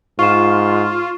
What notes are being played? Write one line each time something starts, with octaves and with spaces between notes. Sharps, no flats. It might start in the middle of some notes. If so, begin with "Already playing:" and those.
G#2 F4 C#6 E7